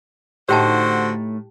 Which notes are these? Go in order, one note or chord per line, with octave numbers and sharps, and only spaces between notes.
A2 D3 D#4 F#4 G4 C5 G5 A5